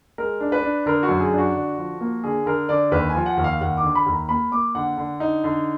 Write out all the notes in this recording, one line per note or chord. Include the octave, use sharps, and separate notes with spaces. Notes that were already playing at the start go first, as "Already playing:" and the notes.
G#3 A#4
D4
B4
D4
D3 A#4
F#4
F#2
G#4
D4
F#4
D3
F3
A#3
D3 G#4
D3 A#4
D3 D5
D#2 B4
G#5
F3
F#5
D#2
F5
D#2 F#5
D6
D3
B5
D#2
A#5
A#3 B5
A#3 D6
D3 F#5
D3
D#4
D3